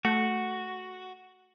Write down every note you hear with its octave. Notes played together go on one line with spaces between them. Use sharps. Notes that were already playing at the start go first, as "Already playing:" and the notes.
A3 F#4